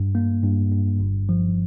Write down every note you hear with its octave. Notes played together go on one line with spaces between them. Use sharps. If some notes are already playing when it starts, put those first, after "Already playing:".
Already playing: G2
A#3
G2
G2
G1
F3